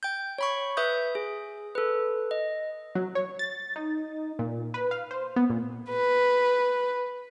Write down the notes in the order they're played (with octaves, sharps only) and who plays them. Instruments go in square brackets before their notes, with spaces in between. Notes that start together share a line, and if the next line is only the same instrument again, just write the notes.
[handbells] G5 G6
C#5 B5 C#6
B4 E5 D#6 G6
G#4
A4 B4
D#5
[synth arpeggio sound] F#3
C#5
A6
D#4
A#2
B4
F5
C5
B3
A#2
[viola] B4